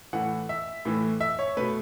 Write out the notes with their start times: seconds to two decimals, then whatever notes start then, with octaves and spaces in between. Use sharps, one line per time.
0.13 A2 E3 A3 F#5
0.49 E5
0.85 A2 E3 A3
1.21 E5
1.39 C#5
1.57 B2 A3 B4